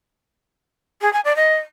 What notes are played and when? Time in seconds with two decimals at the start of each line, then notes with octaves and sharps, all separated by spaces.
1.01 G#4
1.13 G#5
1.24 D5
1.36 D#5